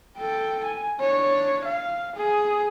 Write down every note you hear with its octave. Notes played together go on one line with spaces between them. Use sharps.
A4 G5
G#5
D4 C#5
F5
G#4